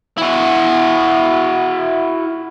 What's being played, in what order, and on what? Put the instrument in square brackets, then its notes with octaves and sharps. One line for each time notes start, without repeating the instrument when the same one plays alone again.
[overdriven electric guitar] E4 F#4